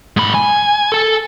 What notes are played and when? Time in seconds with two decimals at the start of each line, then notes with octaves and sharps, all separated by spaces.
0.17 G#2 B5
0.34 G#5
0.92 A4 A5